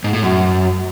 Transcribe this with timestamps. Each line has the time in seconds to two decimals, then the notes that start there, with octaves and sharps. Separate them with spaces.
0.04 G#2
0.13 A2
0.22 F#2